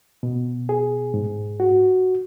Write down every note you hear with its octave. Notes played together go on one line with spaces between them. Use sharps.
B2
G#4
G#2
F#4